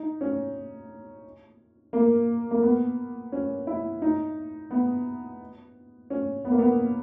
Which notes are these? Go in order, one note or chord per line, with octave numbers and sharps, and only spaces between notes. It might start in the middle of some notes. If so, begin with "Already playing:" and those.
Already playing: D#4
C#4
A#3
A#3
B3
C#4
E4
D#4
B3
C#4
B3
A#3
B3